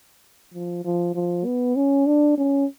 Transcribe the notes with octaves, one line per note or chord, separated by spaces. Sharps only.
F3
F3
F3
B3
C#4
D4
C#4